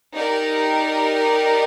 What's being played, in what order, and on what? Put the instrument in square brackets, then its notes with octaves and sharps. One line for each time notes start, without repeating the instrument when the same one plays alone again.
[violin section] D#4 G4 A#4 D5